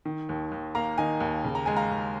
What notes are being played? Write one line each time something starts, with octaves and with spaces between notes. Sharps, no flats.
D#3
D#2
D#2
A#3 F5 A#5
D#3 D#5 G#5
D#2
C#3
A#5
G#3 G#5
F5 A#5
D#2